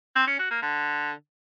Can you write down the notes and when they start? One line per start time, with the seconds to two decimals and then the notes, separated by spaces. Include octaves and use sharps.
0.16 C4
0.28 C#4
0.39 F#4
0.51 A#3
0.62 D3